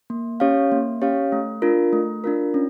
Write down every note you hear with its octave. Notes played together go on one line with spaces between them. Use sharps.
A#3
C#4 G4 C#5 F5
A#3
C#4 G4 C#5 F5
A3
D4 F4 A#4
A3
D4 F4 A#4
C#4